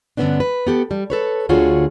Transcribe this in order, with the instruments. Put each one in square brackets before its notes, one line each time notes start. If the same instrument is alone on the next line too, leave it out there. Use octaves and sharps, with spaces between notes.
[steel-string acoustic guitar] G2 D3 G#3 B3 C#4 D4
B4
B3 G4 A4
G3
A4 B4 C#5
D2 D3 F4 F#4 G#4 C#5